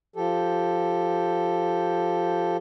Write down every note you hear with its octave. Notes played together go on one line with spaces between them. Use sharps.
F3 G4 A4